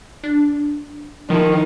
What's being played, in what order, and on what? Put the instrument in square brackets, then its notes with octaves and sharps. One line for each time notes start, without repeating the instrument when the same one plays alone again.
[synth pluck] D4
[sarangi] D#3 [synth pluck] F3 E4